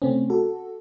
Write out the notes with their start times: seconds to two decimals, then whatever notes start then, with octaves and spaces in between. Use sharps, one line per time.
0.02 C3 A3 C4 C#4
0.30 F#4 A4